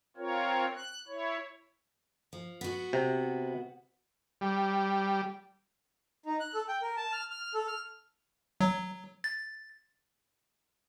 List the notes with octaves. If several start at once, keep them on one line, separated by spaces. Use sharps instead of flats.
C4 F4 A#4 C#5
F#6
E4 C#5
F3
B3 F#4
C3
G3
D#4
F#6
A4
G5
A#4
A5
F6
F6
A4
F6
F#3
A6